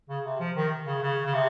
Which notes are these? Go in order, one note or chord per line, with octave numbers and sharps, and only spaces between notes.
C#3
C3
F3
D#3
C#3
C#3
C#3
C3